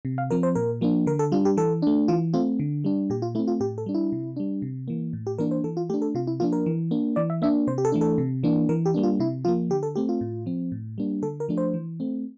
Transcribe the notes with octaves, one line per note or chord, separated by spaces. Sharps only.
C3
F5
F3 C4 A#4
C5
A#2 A#4
F3 A#3 D4
D3 A#4
A4
G3 D4 F4
G4
E3 A4
A3 D4
E3 F4
A3 C4 F4
D3
G3 D4
A#2 G4
F4
A3 C4 E4
F4
A2 G4
A4
G3 D4
E4
C3
G3 D4
C3
E3 A#3
A2
G4
E3 A#3 D4 A#4
C5
E3 A4
F4
A3 D4 G4
A4
C3 F4
E4
F3 A#3 D4 F4
A#4
E3
A#3 D4
E3 D5
E5
A#3 D4 E5
C3 C5
G4
A4
E3 A3 D4
A4
C3
E3 A#3 D4
E3 A#4
G4
G3 A#3 D4
F4
C3 E4
F3 A#3 F4
D3 G4
A4
A3 C4 G4
F4
A2
F3 C4
A2
G3 A#3 D4
D3 A4
A#4
F3 A3 D4
C5
E3
A3 C4